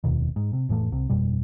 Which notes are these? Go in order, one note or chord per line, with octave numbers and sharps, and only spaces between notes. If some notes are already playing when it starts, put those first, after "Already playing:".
F1 D#2 B2 D#3
G#2
C3
F1 A2 E3 A3
C2 C3
G1 F2 B2 G3